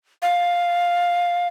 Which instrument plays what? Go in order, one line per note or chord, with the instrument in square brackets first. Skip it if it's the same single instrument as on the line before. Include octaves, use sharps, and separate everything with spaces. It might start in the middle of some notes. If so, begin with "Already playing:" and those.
[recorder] F5